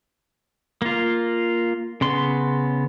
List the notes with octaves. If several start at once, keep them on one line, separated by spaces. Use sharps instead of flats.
A#3 F4
C#3 B3 C6